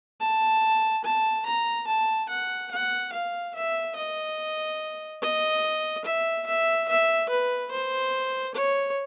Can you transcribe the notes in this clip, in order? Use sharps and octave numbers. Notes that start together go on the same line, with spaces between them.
A5
A5
A#5
A5
F#5
F#5
F5
E5
D#5
D#5
E5
E5
E5
B4
C5
C#5